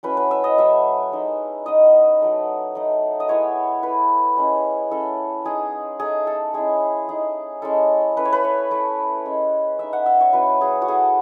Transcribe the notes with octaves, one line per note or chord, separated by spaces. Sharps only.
F#3 A3 C#4 E4 B4
B4
E5
D#5
F#3 A3 E4 E5
G#3 D#4
G#3 B3 D#4 D#5
F#3 A3 D#4
A3 D#4
D#5
G#3 B3 E4 C#5
A3 E4 B4
G#3 C#4 E4
A3 C#4 E4 A4
G#3 D#4 G#4
A3 D#4 G#4
A4
G#3 C#4 E4 G#4
A3 D#4 G#4
G#3 C#4 E4 A4
A3 C#4 E4 B4
C#5
B4
C#5
A3 E4
G#3 C#4 E4
A3 D#4 E5
F#5
E5
C#5
F#3 C#4 E4 B4
G#4
F#4
A3 E4 G#4